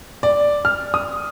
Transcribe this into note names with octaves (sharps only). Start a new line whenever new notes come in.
D5
F6
D#6